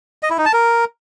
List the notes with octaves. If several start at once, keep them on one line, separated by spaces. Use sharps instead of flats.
D#5
E4
D#4
A5
A#4